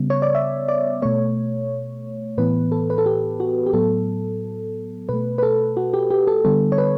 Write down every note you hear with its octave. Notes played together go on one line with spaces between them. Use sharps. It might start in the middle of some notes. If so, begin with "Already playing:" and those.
Already playing: C#3 G3 B3
C#5
D5
E5
D5
B2 A3 C#5
A2 E3 B3 B4
A4
B4
A4
G4
F#4
G4
A2 F#3 B3 A4
B2 A3 B4
B4
A4
F#4
G4
G4
A4
D3 G3 B3 A4
C#5
B4